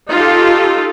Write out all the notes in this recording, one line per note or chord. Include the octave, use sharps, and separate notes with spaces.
D#4 F4 G4 A4